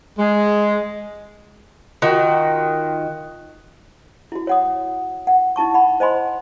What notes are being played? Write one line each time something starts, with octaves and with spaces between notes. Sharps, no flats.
G#3
D#3 F4 F#4 G5
E4 F#4
C#5 F#5 D#6
F#5
D#4 E4 A5 C#6
F#5 B5
C5 D#5 G#5 B5 C6